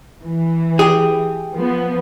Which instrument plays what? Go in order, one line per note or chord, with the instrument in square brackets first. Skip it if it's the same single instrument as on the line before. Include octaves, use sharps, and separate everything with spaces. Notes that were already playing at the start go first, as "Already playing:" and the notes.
[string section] E3
[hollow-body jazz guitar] G4 G#4
[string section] F3 B3